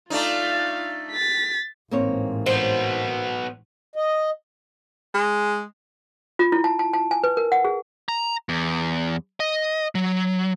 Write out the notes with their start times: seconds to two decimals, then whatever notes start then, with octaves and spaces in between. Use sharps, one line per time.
0.10 A3 D4 D#4 F4 F5
1.12 A6 B6
1.91 A1 G#2 A#3 C4 C#5
2.46 F#3 B3 C5
3.96 D#5
5.14 G#3
6.39 F4
6.52 E4
6.64 A5
6.79 A5
6.93 A5
7.11 G#5
7.24 B4
7.37 A#4
7.52 F#5
7.65 G#4
8.09 A#5
8.49 E2
9.40 D#5
9.95 F#3